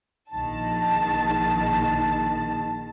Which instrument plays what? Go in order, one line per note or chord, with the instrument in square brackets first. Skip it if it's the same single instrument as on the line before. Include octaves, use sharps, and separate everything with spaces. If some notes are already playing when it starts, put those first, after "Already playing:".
[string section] A#1 D#3 A5